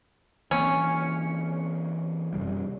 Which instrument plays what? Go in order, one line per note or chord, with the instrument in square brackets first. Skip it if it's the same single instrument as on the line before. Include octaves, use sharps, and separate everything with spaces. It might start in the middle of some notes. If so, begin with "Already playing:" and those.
[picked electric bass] E3 A#3 C4 [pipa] C#4
[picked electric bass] F#2 C3 G3